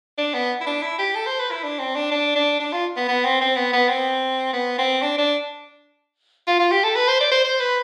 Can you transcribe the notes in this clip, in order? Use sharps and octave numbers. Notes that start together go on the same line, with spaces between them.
D4
B3
E4
D4
E4
G4
A4
C5
B4
E4
D4
C4
D4
D4
D4
D4
F4
B3
B3
C4
C4
B3
B3
C4
B3
C4
D4
D4
F4
F4
G4
A4
B4
C5
D5
C5
C5
B4